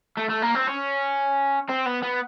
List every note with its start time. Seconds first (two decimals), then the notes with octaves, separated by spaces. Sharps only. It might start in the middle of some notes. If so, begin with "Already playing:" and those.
0.17 A3
0.29 A3
0.42 A#3
0.55 C4
0.67 C#4
1.69 C4
1.86 B3
2.02 B3